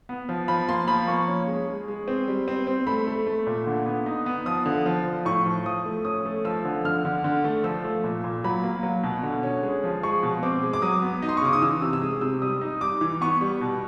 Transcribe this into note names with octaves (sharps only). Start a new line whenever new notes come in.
B3
F3
F3 B5
A#3 C6
F3 B5
A#3 C#6
C#4
G#3
G#3
G#3
C4
G3
C4
C4
A3 B5
A3
A3
A#2
D3
B3
D#4
B3
F3 D#6
D3
F3
F3
A2 C#6
F3
F3 D#6
A3
C#4 D#6
A3
F3 E6
D3
D3 F6
D3
D3
A3
F3 E6
A3
A#2
A#2
F#3 B5
A#3
F#3
B2
D3
C#4
G#3
F3
G#3 C#6
B2
C4 D6
G#3
D6
F#3 D#6
B3
D#4
C6
C#6
C#3 D6
D#6
E3 E6
C3 E6
E6
G#3 D#6
C3 E6
G3 D#6
D#4
G3 D6
E3
B3 C#6
G3
B2